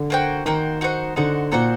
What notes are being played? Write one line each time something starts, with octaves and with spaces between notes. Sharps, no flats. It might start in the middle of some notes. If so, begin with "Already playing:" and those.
Already playing: D3
A#3 F#4 C5 G5
D#3 A#3 F#4 C5 G5
D#4 F#4 C5 F#5
D3 D#4 F#4 C5 F#5
A#2 D#4 F#4 C5 F#5